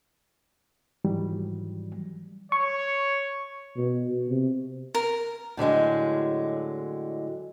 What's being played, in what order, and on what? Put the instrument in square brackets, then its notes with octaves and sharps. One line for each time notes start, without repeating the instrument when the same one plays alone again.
[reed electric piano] G#2 D#3 E3 F#3 G3
[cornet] C#5 [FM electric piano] C#6
[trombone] B2
C3
[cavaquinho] A#4
[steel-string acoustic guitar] A2 D3 F#3 G#3